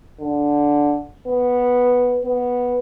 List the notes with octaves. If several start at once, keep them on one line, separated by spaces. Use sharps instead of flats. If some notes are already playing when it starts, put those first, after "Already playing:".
D3
B3
B3